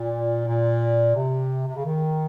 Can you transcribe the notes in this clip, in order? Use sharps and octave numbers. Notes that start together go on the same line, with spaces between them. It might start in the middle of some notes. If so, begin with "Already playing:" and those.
Already playing: A#2
A#2
C3
C3
C#3
D#3